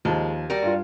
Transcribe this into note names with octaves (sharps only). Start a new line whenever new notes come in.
D#2 F3 G#3 A5
G3 F#4 A#4
G2 F4